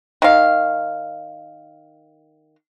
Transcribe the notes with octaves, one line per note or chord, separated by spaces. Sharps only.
D#3 F5